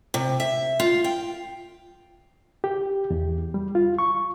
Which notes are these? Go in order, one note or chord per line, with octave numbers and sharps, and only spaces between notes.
C3
E5
F4
G5
G4
E2
G3
F4
C#6